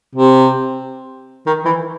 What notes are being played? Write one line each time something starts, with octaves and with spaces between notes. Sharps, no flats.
C3
D#3
E3